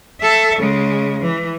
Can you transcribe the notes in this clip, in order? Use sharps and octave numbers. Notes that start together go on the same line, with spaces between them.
A4 E5
C#3 G#3
E3